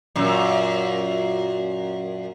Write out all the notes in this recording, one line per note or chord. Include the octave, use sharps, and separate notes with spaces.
F#2 A#2